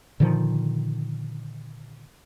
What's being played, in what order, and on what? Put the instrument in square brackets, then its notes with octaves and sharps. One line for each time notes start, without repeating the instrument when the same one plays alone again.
[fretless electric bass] A#2 D3 D#3 F3